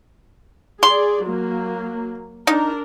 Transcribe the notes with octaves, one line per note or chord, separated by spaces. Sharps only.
G#4 D5 C6
F#3 A#3
D4 D#4 A#4